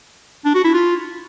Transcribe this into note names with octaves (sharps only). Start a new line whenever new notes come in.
D4
F#4
E4
F4